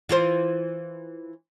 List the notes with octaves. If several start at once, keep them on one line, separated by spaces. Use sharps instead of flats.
E3 F4 C5